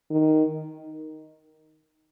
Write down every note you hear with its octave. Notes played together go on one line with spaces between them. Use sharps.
D#3